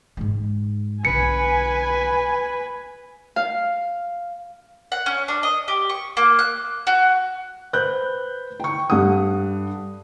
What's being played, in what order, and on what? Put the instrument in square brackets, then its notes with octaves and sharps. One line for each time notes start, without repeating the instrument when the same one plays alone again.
[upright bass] G#2 G#3
[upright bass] B1 D3 [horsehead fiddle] B4 [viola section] G#5 [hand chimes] C#7
[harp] F5
[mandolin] F#5
C#4
D4
D#5
G4
C#6
A#3
F#6
F#4
[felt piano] B4 C5 B5 F#6 G6
G5 C#6
G2 G3 A4 F#5 D#6